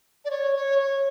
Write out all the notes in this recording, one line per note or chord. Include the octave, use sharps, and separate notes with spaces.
D5
C#5
C#5
C#5